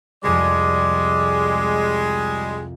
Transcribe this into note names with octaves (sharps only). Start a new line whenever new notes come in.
C2 F2 G3 G#3 D5